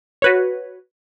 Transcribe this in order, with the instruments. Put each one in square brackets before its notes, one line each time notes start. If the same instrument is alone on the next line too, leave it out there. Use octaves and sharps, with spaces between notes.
[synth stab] F#4 B4 C#5